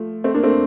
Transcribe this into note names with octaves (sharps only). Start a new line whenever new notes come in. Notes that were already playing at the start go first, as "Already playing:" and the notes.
Already playing: F3 A3
A3 C4
A#3 D4
A3 C4